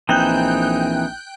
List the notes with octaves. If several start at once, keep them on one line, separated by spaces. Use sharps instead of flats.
A#1 E3 C4 D#4 G5 F#6 G6